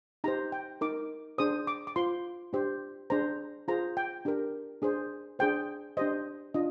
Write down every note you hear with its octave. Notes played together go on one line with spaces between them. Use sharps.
D#4 G4 C5 A#5
G5
D#4 A#4 D6
D4 G#4 C5 D#6
D6
D6
F4 C5 C6
D4 G4 C5
D4 G#4 C5 A#5
F4 G#4 C5 A#5
G5
D4 G4 A#4
D4 G#4 C5
D4 G#4 C5 G5
D4 G4 C5 D#5
D4 F4 D#5